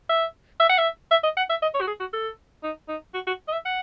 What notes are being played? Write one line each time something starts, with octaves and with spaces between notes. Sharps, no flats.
E5
E5
F#5
E5
E5
D#5
F#5
E5
D#5
C#5
F#4
G#4
F#4
A4
D#4
D#4
F#4
F#4
D#5
E5
F#5